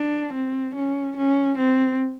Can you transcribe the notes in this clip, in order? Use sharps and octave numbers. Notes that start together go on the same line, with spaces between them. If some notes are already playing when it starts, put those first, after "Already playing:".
Already playing: D4
C4
C#4
C#4
C4